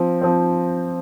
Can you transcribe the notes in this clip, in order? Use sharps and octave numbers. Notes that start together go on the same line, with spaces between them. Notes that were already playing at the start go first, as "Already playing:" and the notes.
Already playing: F3 C4
F3 C4